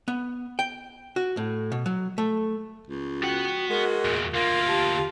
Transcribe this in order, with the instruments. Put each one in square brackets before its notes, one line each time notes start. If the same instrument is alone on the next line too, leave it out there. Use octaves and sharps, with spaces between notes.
[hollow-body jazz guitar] B3
G5
F#4
A2
B2
F#3
A3
[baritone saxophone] C#2
[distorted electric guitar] B3 F#5 [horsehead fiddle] F#4 [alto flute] G5
[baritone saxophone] G#3 [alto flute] A#4
[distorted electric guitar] E2 A#2
[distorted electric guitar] D2 A#3 [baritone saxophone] F4 [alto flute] A#4
[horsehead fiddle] G4 [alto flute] A5